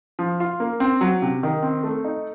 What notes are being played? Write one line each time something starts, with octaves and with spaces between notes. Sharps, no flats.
F3
F4
A#3
C4
F#3
C3
D#3
C4
A3
D#4